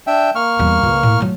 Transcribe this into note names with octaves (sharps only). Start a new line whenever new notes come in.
D4 E5 G5
A#3 C#6 F6
E2 G3
C#2
A2
F#3 A3